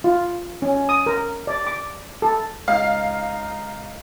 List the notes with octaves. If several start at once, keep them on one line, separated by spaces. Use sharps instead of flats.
F4
C#4
D#6
A#4
D5
D6
A4
C#2 D#4 F5